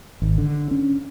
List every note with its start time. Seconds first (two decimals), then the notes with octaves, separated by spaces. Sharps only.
0.22 G#1
0.38 D3
0.71 C#4